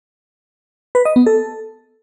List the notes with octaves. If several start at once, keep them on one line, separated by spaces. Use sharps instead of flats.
B4
D#5
B3
A4